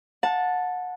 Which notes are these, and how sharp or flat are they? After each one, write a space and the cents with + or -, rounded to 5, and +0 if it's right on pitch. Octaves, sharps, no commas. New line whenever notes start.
F#5 -25 A5 +0